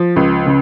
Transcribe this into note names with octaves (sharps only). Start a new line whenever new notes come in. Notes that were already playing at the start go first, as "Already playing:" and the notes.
Already playing: F3
C#2
C#3